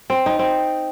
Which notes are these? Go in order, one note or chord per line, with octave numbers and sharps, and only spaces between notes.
C4
D#4
C4